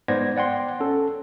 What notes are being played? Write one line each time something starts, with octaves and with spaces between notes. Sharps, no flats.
G#2 B3 C5 D5 G#6 A#6
D5 F#5 G5 C6
C#4 A4